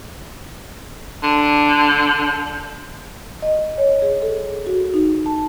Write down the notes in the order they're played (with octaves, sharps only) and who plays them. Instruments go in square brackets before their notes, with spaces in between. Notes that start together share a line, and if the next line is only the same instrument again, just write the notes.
[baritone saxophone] D3
[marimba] D#5
C#5
G#4
A4
F#4
D#4
A5